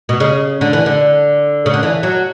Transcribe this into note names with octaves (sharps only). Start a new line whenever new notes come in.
B2
C#3
D3
E3
D3
C#3
D3
E3
F#3